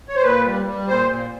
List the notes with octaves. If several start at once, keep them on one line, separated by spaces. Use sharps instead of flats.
C#5
C5
A#2 B4
G3
G3
A#2 C5
A#2